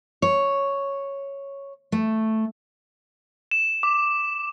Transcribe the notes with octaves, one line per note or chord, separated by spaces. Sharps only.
C#5
A3
E7
D6